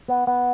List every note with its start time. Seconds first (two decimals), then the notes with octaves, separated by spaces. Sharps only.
0.08 B3
0.27 B3